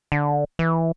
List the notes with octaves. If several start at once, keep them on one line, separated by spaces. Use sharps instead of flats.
D3
E3